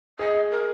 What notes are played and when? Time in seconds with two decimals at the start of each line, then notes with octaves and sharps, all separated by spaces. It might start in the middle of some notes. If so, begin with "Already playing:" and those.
0.19 G#4 D#5
0.51 A#4